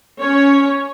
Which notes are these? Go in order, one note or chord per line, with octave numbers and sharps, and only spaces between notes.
C#4 C#5